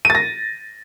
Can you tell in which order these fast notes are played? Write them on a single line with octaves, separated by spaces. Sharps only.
D#7 A6 A#6